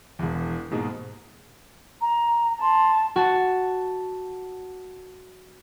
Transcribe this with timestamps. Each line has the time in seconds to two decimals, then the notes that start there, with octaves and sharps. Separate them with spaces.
0.19 E1 E2
0.71 G#2 B2 G#3 A#3
2.01 A#5
2.61 A5 C6
3.16 F#4 A5